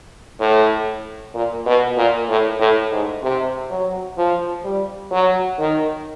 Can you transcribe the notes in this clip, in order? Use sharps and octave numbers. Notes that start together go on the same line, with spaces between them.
A2
A#2
B2
A#2
A2
A2
G#2
C3
F#3
F3
G3
F#3
D#3